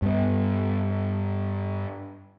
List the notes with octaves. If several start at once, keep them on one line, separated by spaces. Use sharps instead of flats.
G2 B3